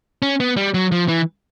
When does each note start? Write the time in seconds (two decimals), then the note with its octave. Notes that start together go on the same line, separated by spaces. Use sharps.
0.22 C#4
0.40 B3
0.57 G3
0.74 F#3
0.92 F3
1.08 E3